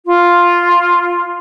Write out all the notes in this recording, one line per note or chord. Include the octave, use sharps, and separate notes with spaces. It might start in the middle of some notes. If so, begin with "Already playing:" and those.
F4